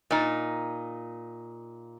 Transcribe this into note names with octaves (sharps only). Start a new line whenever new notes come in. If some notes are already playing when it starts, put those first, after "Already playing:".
A#2 D#4